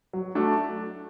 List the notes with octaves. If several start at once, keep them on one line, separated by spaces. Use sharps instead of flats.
F#3
A3 D4 F#4